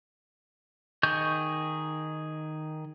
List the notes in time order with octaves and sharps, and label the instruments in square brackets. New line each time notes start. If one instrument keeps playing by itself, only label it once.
[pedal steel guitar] D#3 G#4 D#5 C#6 G6